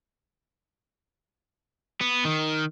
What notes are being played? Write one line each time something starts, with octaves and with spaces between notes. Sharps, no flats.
B3
D#3